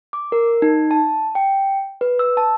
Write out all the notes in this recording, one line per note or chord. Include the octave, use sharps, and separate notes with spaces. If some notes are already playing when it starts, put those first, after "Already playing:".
D6
A#4
D#4
A5
G5
B4
E6
A5